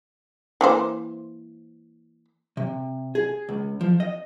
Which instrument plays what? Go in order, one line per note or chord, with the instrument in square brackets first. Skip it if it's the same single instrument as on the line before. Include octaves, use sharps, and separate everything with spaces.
[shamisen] E3 A#3 C5
[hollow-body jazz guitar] C3
G#4
C#2
F3
D#5